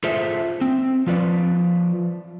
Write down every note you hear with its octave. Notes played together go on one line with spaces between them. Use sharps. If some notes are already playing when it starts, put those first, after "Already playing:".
F4 G#4 A4 C5 E5
C4
F3 F4 B4 D5